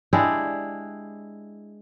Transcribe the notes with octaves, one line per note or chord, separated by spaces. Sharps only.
G#3 D4 E4 G4